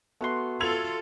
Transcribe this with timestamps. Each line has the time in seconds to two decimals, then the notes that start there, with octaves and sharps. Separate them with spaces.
0.21 A3 B3 F#4 C6
0.60 F4 A4 E6 G#6 F7